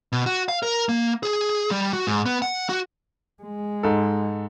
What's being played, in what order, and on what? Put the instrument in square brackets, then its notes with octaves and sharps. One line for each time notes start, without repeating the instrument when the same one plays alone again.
[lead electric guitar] B2
F#4
F5
A#4
A#3
G#4
G3
F#4
G#2
B3
F#5
F#4
[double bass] G#3
[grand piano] G#2 A4